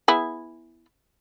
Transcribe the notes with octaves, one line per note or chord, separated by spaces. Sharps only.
B3 E4 G#4